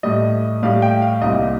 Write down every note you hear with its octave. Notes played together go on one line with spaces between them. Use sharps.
A2 G3 D#5
A2 G3 F5
G5
F5
C2 A#2 G3 D#5